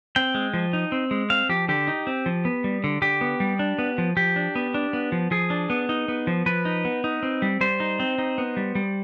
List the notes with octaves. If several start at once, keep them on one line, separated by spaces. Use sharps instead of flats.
C4 G5
G#3
F3
D#4
C4
G#3
C4 F5
F3 G4
D3 G4
D#4
C4
F3
B3
G3
D3
D3 G4
B3
G3
D4
B3
F3
F3 G4
D4
B3
D4
B3
F3
F3 G#4
D4
B3
D#4
B3
F3
F3 B4
D#4
B3
D#4
C4
G3
G3 C5
D#4
C4
D#4
B3
G3
G3